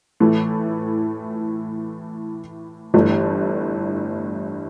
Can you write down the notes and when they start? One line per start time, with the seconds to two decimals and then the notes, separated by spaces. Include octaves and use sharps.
0.20 A2 E3 A3
2.94 G1 G2 E3 A3